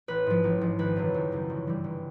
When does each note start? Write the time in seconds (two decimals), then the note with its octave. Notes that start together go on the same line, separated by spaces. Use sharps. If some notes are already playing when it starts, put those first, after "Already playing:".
0.08 A1 B4
0.26 G#2 F3
0.44 A1
0.61 G#2 F3
0.79 G#1 B4
0.96 F#2 C#3 E3
1.14 G#1
1.31 F#2 C#3 E3
1.50 G1
1.67 G2 E3 G3
1.84 G1